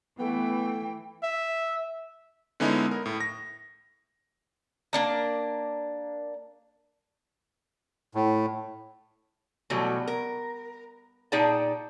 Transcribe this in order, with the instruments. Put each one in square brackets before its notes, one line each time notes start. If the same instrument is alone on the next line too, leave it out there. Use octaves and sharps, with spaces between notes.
[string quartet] E3 [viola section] A3 [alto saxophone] B3 [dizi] G5
[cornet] E5
[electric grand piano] D3 G#3 B3 C#4 D#4 E4
A#4
A2
A#6
[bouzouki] A#3 D4 A#5
[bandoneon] A2
[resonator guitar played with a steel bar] B2 E3 F#3 G3 A3
A#4
A#2 D#4 G#4 D5 G5 A5